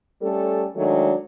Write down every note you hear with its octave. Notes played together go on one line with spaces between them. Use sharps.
G3 A3 C#4 A4
D#3 F#3 G#3 A3 D4